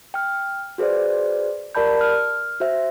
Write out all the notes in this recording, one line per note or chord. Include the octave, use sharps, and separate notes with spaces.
G5 F6
F#4 G#4 B4 C5 D5
G4 A#4 D5 A5 B5 G6
F6
F#4 C5 E5